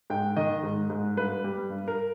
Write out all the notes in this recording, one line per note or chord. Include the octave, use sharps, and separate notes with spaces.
G#2 G5
D#3 D#5
G#2
G#2
G2 B4
G3
G2
A#4